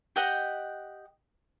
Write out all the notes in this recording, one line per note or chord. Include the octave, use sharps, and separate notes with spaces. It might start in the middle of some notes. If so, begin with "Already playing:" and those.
G4 D#5 F#5 G5